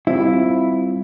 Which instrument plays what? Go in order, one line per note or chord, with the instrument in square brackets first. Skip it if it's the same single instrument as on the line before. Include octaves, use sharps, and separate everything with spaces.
[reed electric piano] G3 C4 F4 [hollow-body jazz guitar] E4